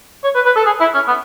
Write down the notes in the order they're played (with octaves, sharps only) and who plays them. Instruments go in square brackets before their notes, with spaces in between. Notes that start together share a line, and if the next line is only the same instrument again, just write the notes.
[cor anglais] C#5
B4
B4
A4
G#4
E4
C#4
B3